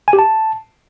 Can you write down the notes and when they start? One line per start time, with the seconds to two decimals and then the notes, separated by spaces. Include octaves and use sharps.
0.08 G#5
0.13 G4
0.19 A5